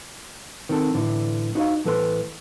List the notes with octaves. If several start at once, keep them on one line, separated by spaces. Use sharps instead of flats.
D#3 C4 A4
A2 D3 E3
D#4 F#4 C5 C#5 D#5 F5
A2 E3 A4 B4 C5